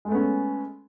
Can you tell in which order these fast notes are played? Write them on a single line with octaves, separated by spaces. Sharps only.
G#3 A3 B3 C#4